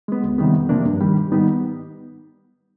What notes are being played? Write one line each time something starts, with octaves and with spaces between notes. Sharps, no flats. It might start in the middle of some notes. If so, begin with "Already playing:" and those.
G#3 B3
D2
C3 D#3 G3 B3
F2
C3 F3 A#3 D4
G2
D#3 G3
G#2
D#3 G3 B3 D#4